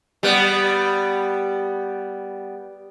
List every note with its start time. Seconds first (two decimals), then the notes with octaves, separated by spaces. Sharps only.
0.23 G3 B3